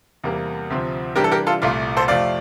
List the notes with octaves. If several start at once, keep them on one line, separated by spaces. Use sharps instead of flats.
E2 C3 G3 A#3
D2 C3 F3 C4
C3 E3 G3 D4 G4 A#4
A4
G4 A#4
F4 A4
C2 A#2 A3 F4
A4 C5
F2 C3 F3 A3 D5 F5